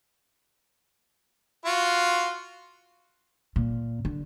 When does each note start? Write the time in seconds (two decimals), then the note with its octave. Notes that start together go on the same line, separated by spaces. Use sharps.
1.66 F4 F#4 C6
3.56 A#2
4.05 D3